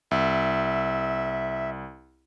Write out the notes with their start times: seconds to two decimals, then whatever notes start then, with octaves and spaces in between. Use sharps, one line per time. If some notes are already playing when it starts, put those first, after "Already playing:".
0.11 C2 E5